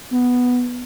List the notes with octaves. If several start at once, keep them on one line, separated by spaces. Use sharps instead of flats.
B3